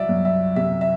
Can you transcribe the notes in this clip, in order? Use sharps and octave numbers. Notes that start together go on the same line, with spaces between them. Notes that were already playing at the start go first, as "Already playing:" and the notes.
Already playing: C2 F#3 D5 E5
F#2
E5
C3 E5
E5